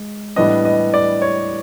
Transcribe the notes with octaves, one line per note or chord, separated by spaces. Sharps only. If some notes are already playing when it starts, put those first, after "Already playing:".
Already playing: G#3
A2 E3 G3 B3 D4 D#5
D#5
D5
C#5